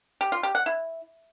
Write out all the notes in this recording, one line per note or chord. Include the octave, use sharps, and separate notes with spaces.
G4
F4
G4
F#5
E4